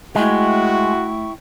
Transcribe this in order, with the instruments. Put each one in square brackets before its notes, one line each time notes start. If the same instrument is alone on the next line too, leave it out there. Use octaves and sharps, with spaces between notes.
[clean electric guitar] G#3 [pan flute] A3 [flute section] E4 G5 C#6 [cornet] F#4